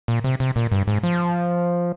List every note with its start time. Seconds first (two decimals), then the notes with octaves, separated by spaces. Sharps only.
0.08 A#2
0.24 C3
0.40 C3
0.56 A#2
0.72 G2
0.87 G#2
1.03 F3